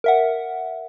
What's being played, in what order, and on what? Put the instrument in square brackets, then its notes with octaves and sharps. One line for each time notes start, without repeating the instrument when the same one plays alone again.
[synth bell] A#4 E5 F#5